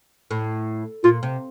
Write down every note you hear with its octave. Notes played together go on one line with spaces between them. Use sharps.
A2
A#2 F4
C3